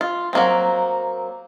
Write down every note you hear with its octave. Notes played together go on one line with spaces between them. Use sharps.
F4
F#3 A#3 C4